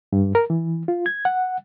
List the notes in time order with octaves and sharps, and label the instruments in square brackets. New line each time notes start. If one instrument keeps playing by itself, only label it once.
[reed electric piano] G2
A#4
E3
F4
G#6
F#5